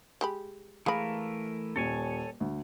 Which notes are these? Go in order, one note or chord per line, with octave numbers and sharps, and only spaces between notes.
G#3 G4 B5
E3 G#3 A3 A#4 F5 B5
D#1 A4 C#5 G#5
D2